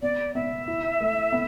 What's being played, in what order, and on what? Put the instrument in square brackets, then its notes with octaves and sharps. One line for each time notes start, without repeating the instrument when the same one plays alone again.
[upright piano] B3 [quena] D5
[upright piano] B3 [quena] E5
[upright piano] E4
A3
B3